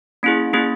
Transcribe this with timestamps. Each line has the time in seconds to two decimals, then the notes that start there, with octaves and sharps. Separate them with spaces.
0.23 A#3 C#4 E4 G#4
0.53 A#3 C#4 E4 G#4